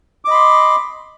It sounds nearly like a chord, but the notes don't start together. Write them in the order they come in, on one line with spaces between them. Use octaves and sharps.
D6 D#5 B5 C6